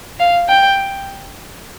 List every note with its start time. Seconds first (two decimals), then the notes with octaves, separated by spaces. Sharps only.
0.19 F5
0.49 G5